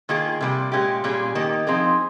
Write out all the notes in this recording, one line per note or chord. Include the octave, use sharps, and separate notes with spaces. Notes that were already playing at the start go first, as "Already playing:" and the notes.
D#3 A#3 F4 G#4
C3 G3 A#3
A#2 G#3 C#4 G4
A#2 G3 C#4 G#4
D#3 A#3 D#4 G4
F3 C4 D#4 G#4